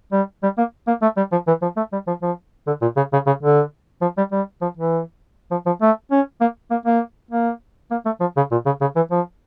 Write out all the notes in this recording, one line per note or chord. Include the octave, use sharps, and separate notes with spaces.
G3
G3
A#3
A#3
A3
G3
F3
E3
F3
A3
G3
F3
F3
D3
A#2
C#3
C#3
C#3
D3
F3
G3
G3
F3
E3
F3
F3
A3
C#4
A#3
A#3
A#3
A#3
A#3
A3
F3
C#3
A#2
C#3
C#3
E3
F3